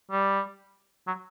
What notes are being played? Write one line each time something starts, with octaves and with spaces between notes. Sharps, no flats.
G3
F#3